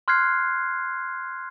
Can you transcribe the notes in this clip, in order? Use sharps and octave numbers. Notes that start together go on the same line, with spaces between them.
C6 F6 F#6 G#6 C7